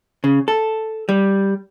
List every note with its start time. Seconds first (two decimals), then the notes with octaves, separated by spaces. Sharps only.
0.24 C#3
0.48 A4
1.09 G3